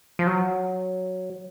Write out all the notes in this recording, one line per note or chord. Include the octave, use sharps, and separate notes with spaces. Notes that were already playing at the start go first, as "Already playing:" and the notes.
F3
F#3